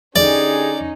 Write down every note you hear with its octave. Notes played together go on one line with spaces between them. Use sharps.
D3 C#4 D#4 G4 G#4 D5